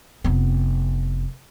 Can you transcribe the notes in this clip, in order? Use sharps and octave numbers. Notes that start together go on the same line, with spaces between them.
F1 B3